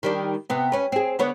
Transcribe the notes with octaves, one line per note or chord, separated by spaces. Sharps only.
D#3 G3 D4
C3 B3
C#4 B4
C4 G#4
D3 B3 C#5